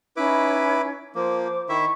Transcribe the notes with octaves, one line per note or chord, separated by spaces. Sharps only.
C#4 D#4 E4 B4 D6 G#6
F3 A#3 C5 D6
D#3 E4 E5 C#6